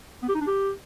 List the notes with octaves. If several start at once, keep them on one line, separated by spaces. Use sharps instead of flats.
B3
G4
D#4
D4
G4